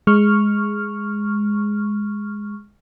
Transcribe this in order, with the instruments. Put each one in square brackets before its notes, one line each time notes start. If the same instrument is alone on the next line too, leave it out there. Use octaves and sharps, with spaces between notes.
[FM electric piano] G#3 C#6 F6